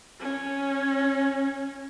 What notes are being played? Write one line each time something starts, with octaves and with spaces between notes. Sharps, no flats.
C#4